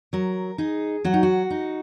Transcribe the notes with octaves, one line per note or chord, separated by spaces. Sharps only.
F#3 A#4
D#4 G#4
F#3 F#4
D#4
F#4
D#4